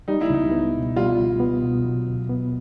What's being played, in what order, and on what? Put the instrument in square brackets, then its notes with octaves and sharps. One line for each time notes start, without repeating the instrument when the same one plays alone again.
[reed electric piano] G3 [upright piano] D#4
[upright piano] E4
[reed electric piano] C#2 [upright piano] D#4
[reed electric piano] B3
B2
[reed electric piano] G3 [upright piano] F4
[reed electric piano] C#2
B3
B2
F#3
D2
B3